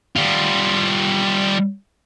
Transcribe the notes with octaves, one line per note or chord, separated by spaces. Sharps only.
G3 F4